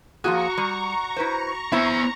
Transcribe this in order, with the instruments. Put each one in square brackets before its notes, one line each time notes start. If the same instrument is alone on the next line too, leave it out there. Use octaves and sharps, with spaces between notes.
[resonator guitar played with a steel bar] F3 A#3 G#4 [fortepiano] F#4 [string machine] A#5 C#6
[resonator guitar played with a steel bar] G3
E4 B4 C5
[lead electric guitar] B3 G#5 [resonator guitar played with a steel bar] E4 C5 [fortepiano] E5